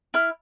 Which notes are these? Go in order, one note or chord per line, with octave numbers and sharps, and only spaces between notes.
E4 F6